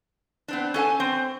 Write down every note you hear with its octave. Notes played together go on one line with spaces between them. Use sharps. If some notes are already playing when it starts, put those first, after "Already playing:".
B3 C4 D4
C#4 A4 F5 G#5
C4